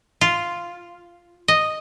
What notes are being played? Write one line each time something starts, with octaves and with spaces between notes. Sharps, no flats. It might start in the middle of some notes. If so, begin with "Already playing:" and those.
F4
D#5